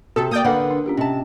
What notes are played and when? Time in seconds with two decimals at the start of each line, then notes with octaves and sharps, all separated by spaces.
0.16 C3 F#4 A4
0.31 A#3 D5 G5 D#6
0.44 D3 A#3 B4 F#5
0.71 D4
0.86 C#4 F4 G4
0.97 C3 C#4 D#5 A5